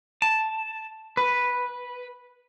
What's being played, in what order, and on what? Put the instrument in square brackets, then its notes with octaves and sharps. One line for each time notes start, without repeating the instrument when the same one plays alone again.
[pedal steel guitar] A5
B4